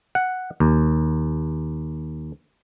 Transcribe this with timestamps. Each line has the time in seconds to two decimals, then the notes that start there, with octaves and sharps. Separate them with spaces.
0.15 F#5
0.60 D#2